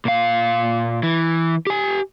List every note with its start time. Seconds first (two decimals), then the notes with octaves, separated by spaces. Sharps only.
0.05 A#2 F5
1.03 E3
1.67 G4 G#5